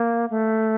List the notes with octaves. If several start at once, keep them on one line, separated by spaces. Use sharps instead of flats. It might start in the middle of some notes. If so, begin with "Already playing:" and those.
Already playing: A#3
A3